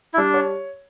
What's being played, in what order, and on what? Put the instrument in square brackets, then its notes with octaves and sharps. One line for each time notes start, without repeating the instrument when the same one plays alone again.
[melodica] E4
[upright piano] G3 [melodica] D4
[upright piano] C#5